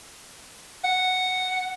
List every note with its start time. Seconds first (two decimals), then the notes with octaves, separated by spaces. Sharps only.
0.84 F#5